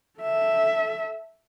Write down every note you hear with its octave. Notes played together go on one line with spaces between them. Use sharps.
A4 E5